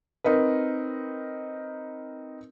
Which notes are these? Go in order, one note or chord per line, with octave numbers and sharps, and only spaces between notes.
C4 D#4 A#4 B4